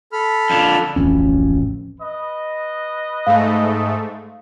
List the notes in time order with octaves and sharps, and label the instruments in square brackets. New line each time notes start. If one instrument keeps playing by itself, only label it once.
[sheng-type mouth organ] A4 B5 F6
[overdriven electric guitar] F2 D3
[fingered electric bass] D1 A1 F2 C#4
[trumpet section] B4 D#5
[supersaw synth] G#2 A3 [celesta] F5